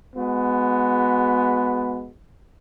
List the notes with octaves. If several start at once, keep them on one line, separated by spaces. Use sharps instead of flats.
G#3 B3 F#4